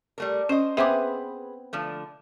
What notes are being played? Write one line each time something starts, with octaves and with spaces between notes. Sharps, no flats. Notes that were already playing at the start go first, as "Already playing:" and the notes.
G3 A3 A#4
C#4 C5 D#5
B3 C4 G#4 B4 C5 E5 D6
D3 F3 A3